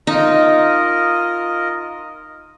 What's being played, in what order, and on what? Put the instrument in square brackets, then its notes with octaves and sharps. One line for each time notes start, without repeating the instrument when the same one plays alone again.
[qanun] D#4 [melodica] F4 A#4 D#5